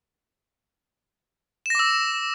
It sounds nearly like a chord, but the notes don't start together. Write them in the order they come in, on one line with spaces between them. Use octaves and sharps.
E7 A#6 D6 E6